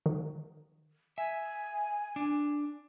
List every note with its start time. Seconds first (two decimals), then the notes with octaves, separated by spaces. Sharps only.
0.06 D#3
1.18 E5 G#5
2.16 D4